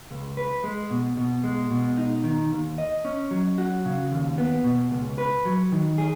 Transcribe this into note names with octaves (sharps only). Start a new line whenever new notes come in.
C#2
B4
G#3
B2
B2
G#3
B2
D#4
D#3
D#2
D#5
C#4
F#3
F#4
C#3
D#2
B3
B2
C#2
B4
F#3
D#3
G#4